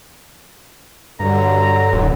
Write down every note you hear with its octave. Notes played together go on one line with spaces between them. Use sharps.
G2 D3 F#3 A#5
D1 F#2